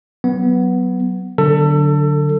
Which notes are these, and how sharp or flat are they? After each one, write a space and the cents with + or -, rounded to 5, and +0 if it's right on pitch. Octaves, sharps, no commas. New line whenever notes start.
F#3 +10 B3 +0
D3 -5 F#3 +0 A4 +25